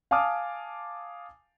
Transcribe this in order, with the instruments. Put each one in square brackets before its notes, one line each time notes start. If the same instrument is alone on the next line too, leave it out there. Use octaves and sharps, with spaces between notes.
[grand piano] F5 G#5 A5 D6 D#6 F6